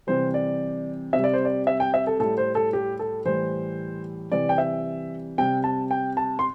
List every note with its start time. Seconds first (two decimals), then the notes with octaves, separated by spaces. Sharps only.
0.07 C3 E3 G3 C5
0.34 D5
1.13 C3 G3 E5
1.24 D5
1.34 C5
1.45 D5
1.67 E5
1.80 G5
1.94 E5
2.07 A4
2.20 A2 G3 A4
2.37 C5
2.55 A4
2.73 G4
2.99 A4
3.25 A2 E3 G3 C5
4.31 C3 E3 G3 D5
4.49 G5
4.58 E5
5.38 C3 G3 G5
5.64 A5
5.91 G5
6.17 A5
6.39 C6